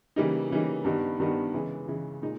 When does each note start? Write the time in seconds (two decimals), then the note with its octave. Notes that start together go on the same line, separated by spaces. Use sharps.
0.16 C#3 E3 G3 A#3 D#4
0.51 C#3 E3 G3 A#3 D#4
0.84 G2 D#3 G3 B3 D#4
1.20 G2 D#3 G3 B3 D#4
1.54 C#3 E3 G#3
1.88 C#3 E3 G#3
2.22 A#2 G#3 D#4